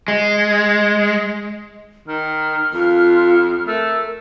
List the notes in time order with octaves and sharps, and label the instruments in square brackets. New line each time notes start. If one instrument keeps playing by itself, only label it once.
[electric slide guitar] G#3
[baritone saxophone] D#3 [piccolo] F6
[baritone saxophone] F2 [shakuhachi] F4
[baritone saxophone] A3 [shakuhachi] A#4 [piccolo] E6